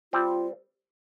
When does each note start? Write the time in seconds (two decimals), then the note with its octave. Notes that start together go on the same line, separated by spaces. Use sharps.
0.13 G3 C4 F4